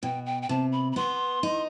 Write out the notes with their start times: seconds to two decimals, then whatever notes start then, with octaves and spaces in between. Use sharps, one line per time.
0.03 B2 G5
0.26 G5
0.42 G5
0.49 C3 A5
0.72 B5
0.92 B5
0.96 B3 C6
1.43 D#4